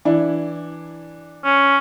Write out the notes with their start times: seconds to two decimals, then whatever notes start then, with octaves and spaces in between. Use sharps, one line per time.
0.05 E3 D4 E4
1.44 C#4